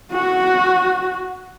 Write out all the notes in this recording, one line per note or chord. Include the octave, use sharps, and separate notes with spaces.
F#4